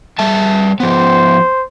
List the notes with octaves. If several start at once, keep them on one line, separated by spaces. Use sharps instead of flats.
G3 E5 A5
F3 B3 C5